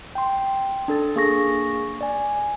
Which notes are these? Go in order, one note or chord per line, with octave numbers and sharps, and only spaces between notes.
G5 C6
D4 A4 A6
A#3 G#4 C#6 A#6
D5 G#5